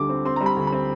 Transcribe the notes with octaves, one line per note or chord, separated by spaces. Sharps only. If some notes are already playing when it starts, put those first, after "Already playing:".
Already playing: D2 D3 G3 D6
C4
C4 C6
A#5
G3
B5
D2
B5
C4